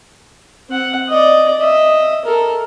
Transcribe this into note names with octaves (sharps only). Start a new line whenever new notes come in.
C4 F#5
D5 D#5
D#5 E5
A4 A#4